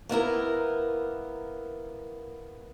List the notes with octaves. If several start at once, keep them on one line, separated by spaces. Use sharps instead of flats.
A#3 B3 E4 A#4